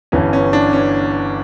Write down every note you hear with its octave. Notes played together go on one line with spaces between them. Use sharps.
G1 G2 E3 C#4
C#4
D4
C#4